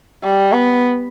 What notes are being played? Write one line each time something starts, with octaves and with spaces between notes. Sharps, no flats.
G3
B3